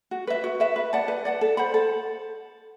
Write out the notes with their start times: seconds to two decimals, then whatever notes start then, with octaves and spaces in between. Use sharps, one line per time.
0.11 F#4
0.27 B4 E5
0.44 F#4
0.60 B4 E5
0.76 B4
0.93 D5 F#5 A5
1.08 B4
1.25 D5 F#5 A5
1.41 A4
1.57 C5 F#5 B5
1.74 A4